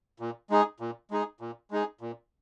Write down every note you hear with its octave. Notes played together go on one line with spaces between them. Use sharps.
A#2
G#3 D#4 G#4
A#2
G#3 D#4 G#4
A#2
G#3 D#4 G#4
A#2